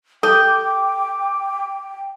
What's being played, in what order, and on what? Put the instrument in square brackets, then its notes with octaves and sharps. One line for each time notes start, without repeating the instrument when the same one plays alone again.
[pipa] G4 [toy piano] A4 [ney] G5 [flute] D6